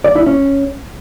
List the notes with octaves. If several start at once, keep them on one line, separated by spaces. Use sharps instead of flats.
D5
E4
C#4